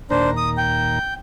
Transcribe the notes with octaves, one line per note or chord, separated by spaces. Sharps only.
D#2 A#2 D4 C5 A#5
D#6
G5